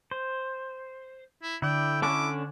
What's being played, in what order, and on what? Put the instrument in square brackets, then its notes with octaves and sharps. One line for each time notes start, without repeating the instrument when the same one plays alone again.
[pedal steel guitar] C5
[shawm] E4
[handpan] D3 [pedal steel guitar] E4 D5 [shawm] G5
[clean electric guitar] D3 C#4 D4 [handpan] C#5 [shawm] D6